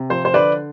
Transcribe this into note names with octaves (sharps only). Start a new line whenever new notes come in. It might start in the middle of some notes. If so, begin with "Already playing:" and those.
Already playing: C3
F3 C5
C5
D3 B4 D5